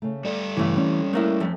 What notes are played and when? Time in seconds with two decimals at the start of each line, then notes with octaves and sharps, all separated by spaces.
0.02 C#3 A3
0.25 G3 A4 D5
0.57 G2 C#3 E3 A3
0.77 C4 C#4 D5
1.13 A3 A#3 E4
1.40 F2 A3